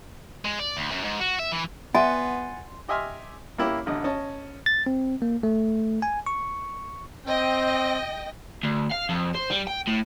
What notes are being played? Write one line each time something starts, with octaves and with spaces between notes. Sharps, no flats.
G#3
D5
D2
F#2
G#2
F#4
E5
E3
B3 E5 F#5 G#5 C6 A6
G4 D#5 E5 G#5 C6 F6
A#3 C#4 E4 G4
A1 D3 D#5
C#4 D#5 A5
A6
C4
A#3
A3
G#5
C#6
C4 D#5 G5
D2
F5
F2
C5
G3
G5
A2